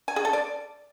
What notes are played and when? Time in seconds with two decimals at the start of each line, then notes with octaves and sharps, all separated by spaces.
0.08 G#5
0.16 G#4
0.25 A4
0.33 D5